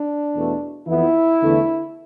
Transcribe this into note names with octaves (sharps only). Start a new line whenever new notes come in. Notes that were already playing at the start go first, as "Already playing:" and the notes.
Already playing: D4
E2 B2 A3
F2 E3 B3 E4
E2 D3 A3